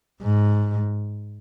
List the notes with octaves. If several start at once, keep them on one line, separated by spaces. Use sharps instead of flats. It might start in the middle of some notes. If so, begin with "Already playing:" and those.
G#2